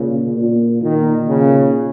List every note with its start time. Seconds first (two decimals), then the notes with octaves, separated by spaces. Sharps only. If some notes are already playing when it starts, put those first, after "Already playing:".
Already playing: A#2 C#3
0.36 A#2
0.83 A#2 D#3
1.29 C#3